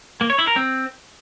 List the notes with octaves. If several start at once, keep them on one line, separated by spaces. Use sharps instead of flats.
A#3
C#5
E4
A#4
C4